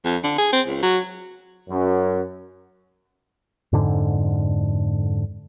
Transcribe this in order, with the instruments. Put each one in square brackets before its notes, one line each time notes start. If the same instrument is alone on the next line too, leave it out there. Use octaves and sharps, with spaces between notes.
[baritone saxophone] F2
D3
G#4
C4
C#2
F#3
[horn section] F#2
[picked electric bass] F2 G#2 D3